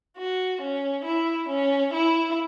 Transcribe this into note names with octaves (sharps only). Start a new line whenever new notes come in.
F#4
C#4
E4
C#4
E4